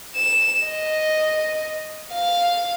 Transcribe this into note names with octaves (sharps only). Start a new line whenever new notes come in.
E7
D#5
F5